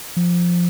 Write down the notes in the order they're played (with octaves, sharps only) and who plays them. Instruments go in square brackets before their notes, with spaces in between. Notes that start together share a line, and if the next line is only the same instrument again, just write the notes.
[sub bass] F3